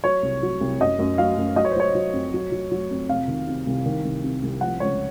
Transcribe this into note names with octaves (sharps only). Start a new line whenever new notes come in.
F#3 C#5
C2
F#3
C2
F#2 D#5
F#2
F#3 F5
F#2
F#3 D#5
C#5
C5
F#3 C#5
F#3
F2
F#3
F#3
F#3
F2
C3 F5
D#3
C3
C2
D#3
C2
C3
C2
F3 F#5
C#2 C#5